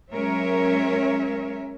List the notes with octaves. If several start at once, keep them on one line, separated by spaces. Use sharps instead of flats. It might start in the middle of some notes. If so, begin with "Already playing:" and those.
F#3 G#3 C#4 A#4 C#5 E5